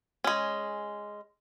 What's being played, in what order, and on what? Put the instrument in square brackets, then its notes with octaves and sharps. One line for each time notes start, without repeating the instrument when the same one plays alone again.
[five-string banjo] G#3 C#4